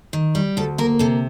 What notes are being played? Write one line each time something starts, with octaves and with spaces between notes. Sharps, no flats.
D#3
G3
D2 A4
A#3 A#4
C3 A4